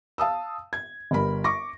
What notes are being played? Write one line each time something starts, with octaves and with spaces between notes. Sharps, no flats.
F5 A5 D#6 E6
G#6
G1 G3 A#4 B5
C#6 D6 A#6